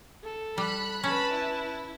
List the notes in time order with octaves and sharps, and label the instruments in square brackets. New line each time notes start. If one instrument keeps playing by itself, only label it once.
[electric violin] A4
[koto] G3 [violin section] B5 F#6
[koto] C#4 [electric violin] B4 A5 [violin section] B5
[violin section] E4